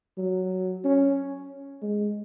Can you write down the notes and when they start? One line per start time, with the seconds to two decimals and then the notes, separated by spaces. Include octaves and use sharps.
0.18 F#3
0.84 C#4
1.82 G#3